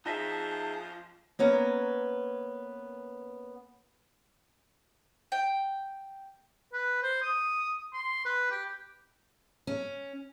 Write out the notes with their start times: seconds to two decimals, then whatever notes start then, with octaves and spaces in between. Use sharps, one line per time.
0.06 F3 D#4 G#4 D#5 E5 A5
1.39 A#3 B3 C#4 A#5
5.32 G5
6.73 B4
7.03 C5
7.22 D#6
7.93 C6
8.25 B4
8.51 G4
9.67 C#4